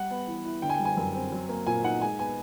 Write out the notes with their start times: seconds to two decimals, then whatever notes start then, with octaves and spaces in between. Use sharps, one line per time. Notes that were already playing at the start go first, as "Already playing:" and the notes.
Already playing: G3 F#5
0.10 B3
0.27 E3
0.45 E4
0.62 D3 G5
0.69 G#5
0.74 G5
0.80 G3
0.85 G#5
0.97 F#2
1.14 C4
1.32 F#3
1.49 A#3
1.67 A#2 G#5
1.84 D#4 F#5
2.01 G#3 G#5
2.19 B3 G#5